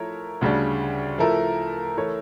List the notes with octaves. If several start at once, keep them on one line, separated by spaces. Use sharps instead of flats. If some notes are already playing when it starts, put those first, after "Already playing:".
Already playing: F3 A3 E4 A#4 C#5
D2 C#3 G3 D4
F3 A3 E4 A#4
E3 A3 E4 A#4 C#5